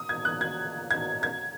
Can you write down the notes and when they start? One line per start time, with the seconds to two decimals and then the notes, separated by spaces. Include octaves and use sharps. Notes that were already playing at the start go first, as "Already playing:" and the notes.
Already playing: D#6
0.09 G#6
0.25 F#6
0.41 G#6
0.91 G#6
1.23 G#6